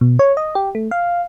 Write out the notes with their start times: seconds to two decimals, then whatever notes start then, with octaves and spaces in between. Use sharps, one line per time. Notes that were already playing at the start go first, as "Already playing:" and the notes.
0.01 B2
0.19 C#5
0.37 D#5
0.55 G4
0.75 A3
0.91 F5